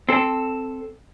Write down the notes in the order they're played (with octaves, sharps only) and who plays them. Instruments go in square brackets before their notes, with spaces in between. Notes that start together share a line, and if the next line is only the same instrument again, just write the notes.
[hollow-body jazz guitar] C4 A4